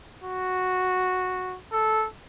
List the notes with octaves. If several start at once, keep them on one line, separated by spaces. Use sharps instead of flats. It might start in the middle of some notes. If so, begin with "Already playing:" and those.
F#4
A4